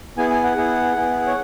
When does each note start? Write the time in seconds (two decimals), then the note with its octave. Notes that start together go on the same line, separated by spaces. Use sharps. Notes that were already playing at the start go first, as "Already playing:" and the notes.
0.17 B3 E4 G#4 G#5
0.30 G#5
0.44 F#5
0.57 B3 E4 G#4
0.96 B3 E4 G#4
1.27 C#5